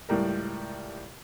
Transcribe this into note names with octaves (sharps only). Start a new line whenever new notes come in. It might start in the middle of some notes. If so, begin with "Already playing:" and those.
C#2 A2 G3 A#4